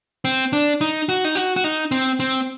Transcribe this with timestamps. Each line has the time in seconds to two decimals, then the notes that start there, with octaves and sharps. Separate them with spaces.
0.25 C4
0.53 D4
0.81 D#4
1.09 F#4
1.25 D#4
1.35 F#4
1.56 F#4
1.64 D#4
1.91 C4
2.20 C4